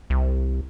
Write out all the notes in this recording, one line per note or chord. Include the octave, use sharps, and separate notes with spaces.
C2